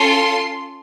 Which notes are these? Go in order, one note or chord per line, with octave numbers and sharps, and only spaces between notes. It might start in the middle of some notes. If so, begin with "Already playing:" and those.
Already playing: C#4 F4 A4 C6